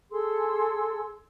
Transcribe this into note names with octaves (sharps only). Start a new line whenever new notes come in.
G#4 A4 C6 E6